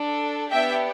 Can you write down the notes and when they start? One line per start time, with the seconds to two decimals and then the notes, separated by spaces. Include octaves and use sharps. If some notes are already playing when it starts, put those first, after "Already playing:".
Already playing: D4 A4
0.51 B3 D4 G4 E5 G5